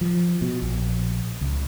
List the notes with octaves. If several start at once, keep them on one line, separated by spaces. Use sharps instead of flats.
F3
B2
A#1
C#2